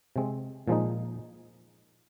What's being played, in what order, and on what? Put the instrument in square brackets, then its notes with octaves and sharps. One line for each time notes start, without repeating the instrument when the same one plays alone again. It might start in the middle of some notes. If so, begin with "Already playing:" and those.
[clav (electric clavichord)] C3 G#3 C4
A#2 F3 G#3 D#4